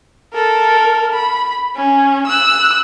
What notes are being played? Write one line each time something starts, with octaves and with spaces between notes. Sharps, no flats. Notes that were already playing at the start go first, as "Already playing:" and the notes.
A4 A#4
B5
C#4
E6 F#6